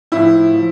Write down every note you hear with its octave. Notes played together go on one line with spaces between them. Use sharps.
A2 F3 E4
F3